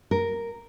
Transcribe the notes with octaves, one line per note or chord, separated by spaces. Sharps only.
A#4